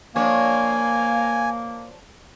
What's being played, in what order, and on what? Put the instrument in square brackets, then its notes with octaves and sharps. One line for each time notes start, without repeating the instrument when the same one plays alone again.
[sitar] F3 D4 C#5 [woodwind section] A#3 [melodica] G#5